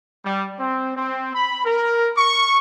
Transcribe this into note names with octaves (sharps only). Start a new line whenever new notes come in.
G3
C4
C4
B5
A#4
C#6